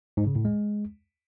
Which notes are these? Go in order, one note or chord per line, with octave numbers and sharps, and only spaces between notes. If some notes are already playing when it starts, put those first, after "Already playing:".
G#2
C#3
A2
G#3